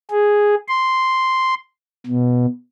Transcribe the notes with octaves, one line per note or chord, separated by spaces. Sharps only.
G#4
C6
B2